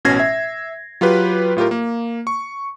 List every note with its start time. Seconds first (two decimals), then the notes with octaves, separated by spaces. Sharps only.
0.05 A1 B2 C#4 G#6 A#6 C7
0.19 E5
1.01 F#3 F4 G4 B4
1.57 A2 F4 G4 A#4
1.71 A#3
2.27 C#6